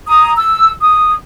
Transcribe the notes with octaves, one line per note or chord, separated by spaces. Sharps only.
A#5 D#6
E6
D#6